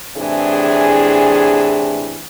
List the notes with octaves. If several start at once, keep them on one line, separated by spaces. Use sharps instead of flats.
A2 C3 E3 D4 G#4